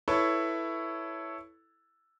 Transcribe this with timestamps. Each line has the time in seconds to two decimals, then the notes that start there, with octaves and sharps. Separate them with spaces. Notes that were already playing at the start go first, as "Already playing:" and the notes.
0.08 E4 A4 B4 C#5